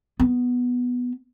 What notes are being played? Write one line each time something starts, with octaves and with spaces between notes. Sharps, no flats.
B3